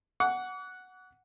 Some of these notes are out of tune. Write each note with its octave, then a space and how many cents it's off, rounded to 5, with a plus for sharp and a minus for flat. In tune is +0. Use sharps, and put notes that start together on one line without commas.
F#5 +0 D6 -45